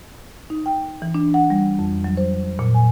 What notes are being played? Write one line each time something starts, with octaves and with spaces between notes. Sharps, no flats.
D#4
G5
E3
D4
F#5
G3
F2
F#3
C5
A#2
G#5